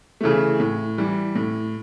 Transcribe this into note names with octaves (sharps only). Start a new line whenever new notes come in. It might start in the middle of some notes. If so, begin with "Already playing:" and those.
C#3 E3 A3
A2
E3 G3
A2